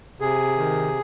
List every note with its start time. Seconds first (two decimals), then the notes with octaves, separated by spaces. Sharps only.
0.20 C3 G#4
0.58 D#3